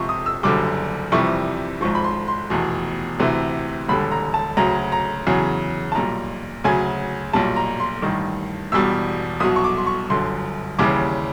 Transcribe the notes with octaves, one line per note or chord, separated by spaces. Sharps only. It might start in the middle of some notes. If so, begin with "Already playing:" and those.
Already playing: C#2 C3 F3 C#6
D#6
E6
F#1 F#2 D3 G3 D6
F2 C3 E3 G3 C#6
G#1 G#2 F3 C#6
B5
C6
C6
F1 E2 B2
D2 C3 E3
E1 D#2 D3 G3 B5
A#5
A5
D2 C#3 F#3 A#5
A#5
E2 C#3 F#3
A5
B1 A#2 G3 A#5
D2 C#3 F#3 G#5
B1 A#2 G3 A5
A#5
C6
A1 G2 D#3
E1 E2 B2 G3 E6
C2 B2 F#3 D#6
C#6
D6
C6
C#6
G1 F#2 D3 C6
D#2 C#3 E3 G3 D6